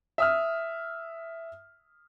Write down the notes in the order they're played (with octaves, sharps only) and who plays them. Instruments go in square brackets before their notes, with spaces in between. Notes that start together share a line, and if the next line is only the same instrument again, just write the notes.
[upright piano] E5 D#6 F6